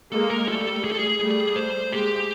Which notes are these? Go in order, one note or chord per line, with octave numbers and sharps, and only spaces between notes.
G#3 A#3 A4
A#4
G3 A3 A4
G#4
A4
G#4
G3 A3
C5
G#3 A#3 G4